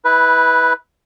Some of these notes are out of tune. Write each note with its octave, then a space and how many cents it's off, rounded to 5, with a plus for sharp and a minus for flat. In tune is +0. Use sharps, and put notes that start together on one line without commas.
E4 -25 B4 +0